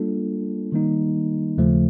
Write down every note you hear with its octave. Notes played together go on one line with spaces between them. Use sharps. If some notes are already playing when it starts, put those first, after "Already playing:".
Already playing: G3 A#3 D4 F4 A4
D#3 G3 A#3 D#4
D#2 C#3 F3 A3